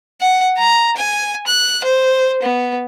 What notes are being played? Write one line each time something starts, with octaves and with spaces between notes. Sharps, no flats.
F#5
A#5
G#5
F#6
C5
B3